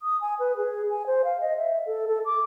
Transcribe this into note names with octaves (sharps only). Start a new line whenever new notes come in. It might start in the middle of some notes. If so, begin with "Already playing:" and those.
D#6
G#5
B4
G#4
G#5
C5
F5
D#5
E5
A4
A4
D6